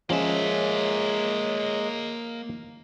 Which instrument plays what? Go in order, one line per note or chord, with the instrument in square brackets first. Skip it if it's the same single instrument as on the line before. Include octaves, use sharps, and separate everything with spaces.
[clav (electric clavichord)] F3 C#4 [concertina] G#3 [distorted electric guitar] A#3 E5 [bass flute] C#5